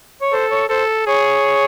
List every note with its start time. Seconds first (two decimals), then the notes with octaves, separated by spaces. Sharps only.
0.21 C#5
0.33 A4 C5
0.51 C#5
0.69 A4 C5
1.06 G#4 C#5